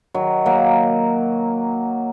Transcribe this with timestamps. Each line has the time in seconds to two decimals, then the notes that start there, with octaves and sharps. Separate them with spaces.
0.14 D#3 F#3
0.46 F#3 A#3